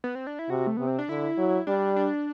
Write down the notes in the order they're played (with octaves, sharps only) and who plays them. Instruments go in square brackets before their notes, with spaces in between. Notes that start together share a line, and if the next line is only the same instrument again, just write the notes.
[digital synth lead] B3
C4
D4
E4
[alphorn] C3 [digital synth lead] F#4
[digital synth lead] A3
[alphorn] C3 [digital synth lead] B3
[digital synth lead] C4
D4
[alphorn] D3 [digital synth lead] E4
[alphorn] F#3
[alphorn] G3 [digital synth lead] D4
[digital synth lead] D4